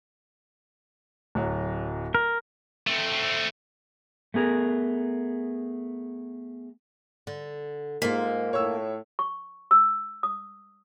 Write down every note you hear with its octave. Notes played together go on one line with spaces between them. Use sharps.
D1 F#3
A#4
A3 C4
A3 B3 G#4 A#4
D3
G#2 A#3 F4 A#4 B6
A2 C#5 E6
C#6
E6
D#6